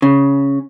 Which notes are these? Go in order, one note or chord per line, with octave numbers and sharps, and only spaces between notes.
C#3